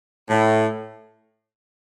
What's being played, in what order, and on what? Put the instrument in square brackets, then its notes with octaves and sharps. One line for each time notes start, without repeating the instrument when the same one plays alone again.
[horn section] A2